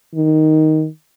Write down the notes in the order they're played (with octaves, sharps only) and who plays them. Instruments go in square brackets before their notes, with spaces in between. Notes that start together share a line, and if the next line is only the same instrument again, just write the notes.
[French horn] D#3